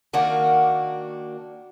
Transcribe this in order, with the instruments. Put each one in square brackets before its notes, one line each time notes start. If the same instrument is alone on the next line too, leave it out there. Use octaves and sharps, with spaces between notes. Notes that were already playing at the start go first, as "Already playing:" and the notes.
[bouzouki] D#3 A#3 D4 F#4